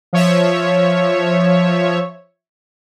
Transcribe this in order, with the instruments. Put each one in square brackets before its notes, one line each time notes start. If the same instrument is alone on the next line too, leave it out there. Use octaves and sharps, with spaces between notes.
[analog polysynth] F3 C#5 E5